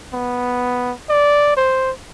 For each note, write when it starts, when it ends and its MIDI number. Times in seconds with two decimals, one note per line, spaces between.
0.14 0.93 59
1.09 1.54 74
1.57 1.91 72